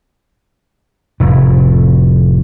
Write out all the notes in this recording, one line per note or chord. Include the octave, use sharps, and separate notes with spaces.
F1 A2